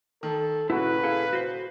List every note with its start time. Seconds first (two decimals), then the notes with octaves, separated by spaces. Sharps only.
0.23 D#3 A4
0.70 D#1 C#3 E4 F#4 B4
1.03 E4 G#4 A4 F5
1.33 F#4 C5